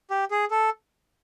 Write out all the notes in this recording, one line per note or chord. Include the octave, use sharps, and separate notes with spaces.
G4
G#4
A4